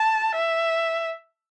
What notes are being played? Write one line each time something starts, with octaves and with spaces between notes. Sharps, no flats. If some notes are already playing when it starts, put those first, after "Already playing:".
Already playing: A5
E5